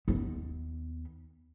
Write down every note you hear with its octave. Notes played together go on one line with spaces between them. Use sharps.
D#2 B3